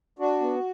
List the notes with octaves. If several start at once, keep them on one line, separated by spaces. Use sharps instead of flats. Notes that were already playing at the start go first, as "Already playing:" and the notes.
D4 F#4
B3